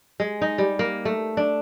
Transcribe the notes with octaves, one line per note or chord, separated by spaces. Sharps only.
G#3
D#4
G3
A#3
A3
D4